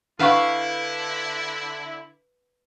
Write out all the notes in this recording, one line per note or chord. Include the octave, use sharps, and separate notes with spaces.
D3 D4 E4 B4 F5 F#5 C#6